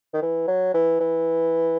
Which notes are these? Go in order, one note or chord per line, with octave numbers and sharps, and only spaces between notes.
D#3
E3
F#3
E3
E3